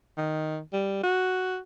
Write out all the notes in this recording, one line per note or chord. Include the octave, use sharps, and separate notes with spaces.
D#3
G3
F#4